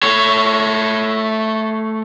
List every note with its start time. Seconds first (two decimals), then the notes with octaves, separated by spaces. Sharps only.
0.03 A3 C#5